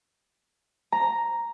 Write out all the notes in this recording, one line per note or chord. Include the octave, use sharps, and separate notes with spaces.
A#5